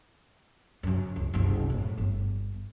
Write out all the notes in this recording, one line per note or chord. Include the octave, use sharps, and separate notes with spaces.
F#2 C#3
C#2
F#1 C2
A2
G1